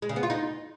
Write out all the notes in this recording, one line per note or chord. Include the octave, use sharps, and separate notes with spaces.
G#3
C#3
B3
F4
D#4